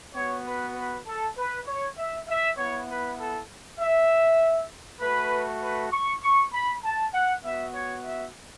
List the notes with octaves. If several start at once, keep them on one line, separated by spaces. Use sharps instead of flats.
B3 F#4 C#5
B4
B4
A4
B4
C#5
E5
E5
B3 E4 C#5
B4
A4
E5
A3 F#4 B4
B4
C#6
C#6
B5
A5
F#5
B3 F#4 E5
C#5
E5